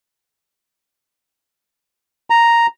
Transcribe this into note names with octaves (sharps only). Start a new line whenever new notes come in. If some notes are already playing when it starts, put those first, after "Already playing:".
A#5